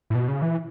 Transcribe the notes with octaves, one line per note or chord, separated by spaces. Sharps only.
A2
B2
C#3
E3